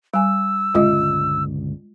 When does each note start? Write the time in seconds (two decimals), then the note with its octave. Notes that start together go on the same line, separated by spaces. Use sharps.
0.14 G3 G#5 E6
0.75 G1 C#2 A#2 G#3 F4 D#5